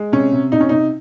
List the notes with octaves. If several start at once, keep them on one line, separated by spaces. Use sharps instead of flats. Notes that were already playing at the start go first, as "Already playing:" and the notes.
Already playing: G#3
C3 C#4
C3
C3 D#4
C#4
C3 D#4